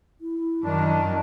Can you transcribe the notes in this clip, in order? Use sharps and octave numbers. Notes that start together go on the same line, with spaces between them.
E4
F#2 D#3 D4